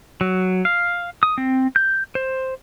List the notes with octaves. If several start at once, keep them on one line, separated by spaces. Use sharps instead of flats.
F#3
F5
D#6
C4
G6
C5